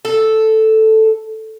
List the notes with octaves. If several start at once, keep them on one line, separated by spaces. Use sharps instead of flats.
A4